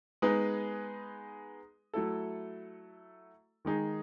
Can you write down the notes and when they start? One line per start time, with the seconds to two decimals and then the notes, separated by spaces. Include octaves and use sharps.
0.22 G#3 B3 D#4 G#4 B4
1.94 F#3 A3 E4 A4
3.65 D#3 G#3 D#4 G#4